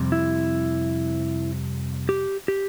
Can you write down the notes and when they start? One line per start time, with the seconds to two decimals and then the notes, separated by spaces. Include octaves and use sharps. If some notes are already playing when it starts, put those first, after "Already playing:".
Already playing: F2 C3 G3
0.12 E4
2.09 G4
2.48 G4